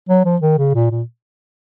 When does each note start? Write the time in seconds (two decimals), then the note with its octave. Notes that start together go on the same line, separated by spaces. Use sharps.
0.09 F#3
0.25 F3
0.42 D#3
0.58 C#3
0.74 A#2
0.91 A#2